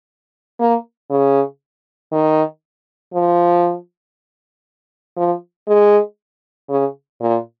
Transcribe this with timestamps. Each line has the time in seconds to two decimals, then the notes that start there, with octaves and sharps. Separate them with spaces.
0.60 A#3
1.10 C#3
2.12 D#3
3.14 F3
5.17 F3
5.68 G#3
6.69 C#3
7.21 A#2